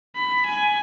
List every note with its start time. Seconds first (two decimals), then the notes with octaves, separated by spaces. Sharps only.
0.16 B5
0.46 G#5